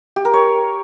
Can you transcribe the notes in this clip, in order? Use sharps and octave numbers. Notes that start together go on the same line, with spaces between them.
G4
A#4
C#5